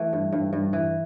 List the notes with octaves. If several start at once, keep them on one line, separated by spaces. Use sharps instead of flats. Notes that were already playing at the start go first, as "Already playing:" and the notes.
Already playing: E3 A3
G2
G2
G2
E3